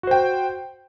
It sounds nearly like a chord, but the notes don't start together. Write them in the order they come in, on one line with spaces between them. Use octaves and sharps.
F#4 C5 G5